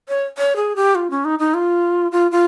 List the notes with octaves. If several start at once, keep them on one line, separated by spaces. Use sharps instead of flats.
C#5
C#5
G#4
G4
F4
C#4
D#4
D#4
F4
F4
F4